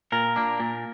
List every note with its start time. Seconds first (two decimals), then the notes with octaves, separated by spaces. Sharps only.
0.12 A#2 A#4
0.36 A#3 D4
0.60 A#2